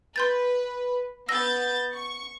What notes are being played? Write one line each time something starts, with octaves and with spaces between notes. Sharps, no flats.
B4 C6 G6 A6
B3 E6 G6 A6 A#6
C#6